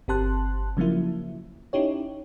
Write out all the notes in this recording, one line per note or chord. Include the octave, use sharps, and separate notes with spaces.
G1 C4 G4 A5 C6 F#6
C#3 F3 F#3 A#3 E4
C#4 D#4 E4 G4 C#5